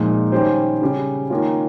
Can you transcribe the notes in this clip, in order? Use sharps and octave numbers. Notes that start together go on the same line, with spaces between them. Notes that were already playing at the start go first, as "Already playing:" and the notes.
Already playing: A#2 F3 G#3 D#4
D#3 G3 C#4 G4 C5
C#3 G3 C#4 G4
D#3 A#3 C#4 F4